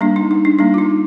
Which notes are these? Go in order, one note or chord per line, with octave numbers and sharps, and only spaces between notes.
G3 A#3 D4
D#4
D#4
D4
G3 A#3 D4
F4
D#4